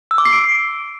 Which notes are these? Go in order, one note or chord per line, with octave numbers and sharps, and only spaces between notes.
E6
D6
C7
D7